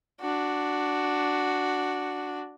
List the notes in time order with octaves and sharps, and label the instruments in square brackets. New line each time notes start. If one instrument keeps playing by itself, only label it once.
[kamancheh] D4 F#4